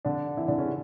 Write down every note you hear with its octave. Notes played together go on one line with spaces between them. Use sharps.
D3 D4
E3 E4
D3 D4
C#3 C#4